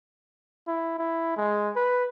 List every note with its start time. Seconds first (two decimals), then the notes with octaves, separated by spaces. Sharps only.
0.68 E4
0.99 E4
1.37 G#3
1.76 B4